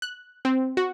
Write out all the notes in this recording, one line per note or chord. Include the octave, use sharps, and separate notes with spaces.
F#6
C4
F#4